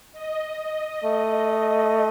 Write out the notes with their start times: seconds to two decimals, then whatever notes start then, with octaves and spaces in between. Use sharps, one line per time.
0.12 D#5
1.04 A3